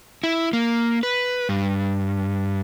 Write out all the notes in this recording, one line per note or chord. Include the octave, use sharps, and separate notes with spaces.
E4
A#3
B4
G2